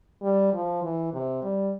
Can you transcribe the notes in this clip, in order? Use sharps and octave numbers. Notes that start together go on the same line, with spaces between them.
G3
F3
E3
C3
G3